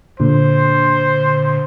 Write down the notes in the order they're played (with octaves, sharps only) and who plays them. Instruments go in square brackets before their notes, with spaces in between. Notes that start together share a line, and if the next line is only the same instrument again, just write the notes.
[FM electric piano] A#2 D3 [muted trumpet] C5